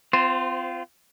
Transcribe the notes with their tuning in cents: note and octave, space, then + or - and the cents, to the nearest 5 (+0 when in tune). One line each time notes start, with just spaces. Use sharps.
C4 -30 F4 -5 C5 +0